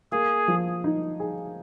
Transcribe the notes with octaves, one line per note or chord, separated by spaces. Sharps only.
A#3 G#4
F3
D#4
G#4